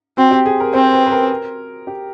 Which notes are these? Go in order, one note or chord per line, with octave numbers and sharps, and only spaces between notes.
C4 F#4
G4
G#4
A#4
C4 C5
B4
B4
A#4
G4